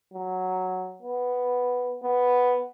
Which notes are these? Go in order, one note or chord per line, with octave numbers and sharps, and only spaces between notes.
F#3
B3
B3